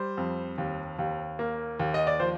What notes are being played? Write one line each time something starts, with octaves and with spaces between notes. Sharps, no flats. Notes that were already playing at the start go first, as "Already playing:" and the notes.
Already playing: G3 C5
F2
D#2
D#2
A#3
D#2
D#5
D5
F3 C5